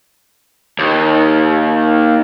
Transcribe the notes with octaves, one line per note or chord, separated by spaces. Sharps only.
D#2